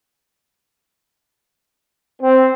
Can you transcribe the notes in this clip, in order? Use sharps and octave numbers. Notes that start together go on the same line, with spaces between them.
C4